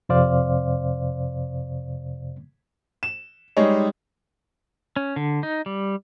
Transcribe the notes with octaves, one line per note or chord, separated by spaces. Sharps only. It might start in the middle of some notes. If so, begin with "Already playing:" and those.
F2 C3 C5 D5 F5
E7
G3 G#3 D#4 G#4 C#5
C#4
D3
D#4
G3